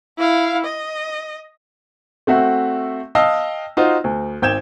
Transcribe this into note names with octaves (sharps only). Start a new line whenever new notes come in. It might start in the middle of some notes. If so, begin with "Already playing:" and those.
E4 F5
D#5
A3 C4 F#4 E5 F#5
D#5 F5 G5 A5 E6
D#4 F4 F#4 C5
D2
G#1 G5 G6 G#6 E7